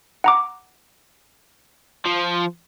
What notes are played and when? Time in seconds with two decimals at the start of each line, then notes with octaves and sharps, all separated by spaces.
0.24 F#5 A#5 D6
2.06 F3